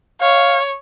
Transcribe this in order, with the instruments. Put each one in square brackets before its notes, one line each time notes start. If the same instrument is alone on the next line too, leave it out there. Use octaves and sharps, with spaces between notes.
[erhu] C#5 [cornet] F5